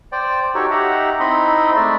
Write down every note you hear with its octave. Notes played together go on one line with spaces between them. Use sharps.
C5 D5 G5
D#4 F#4 G4 A4 C#5
D#4 G4 E5 F#5 A#5
C4 D#4 E4 D#5 B5 C6
G#3 A3 D5 E5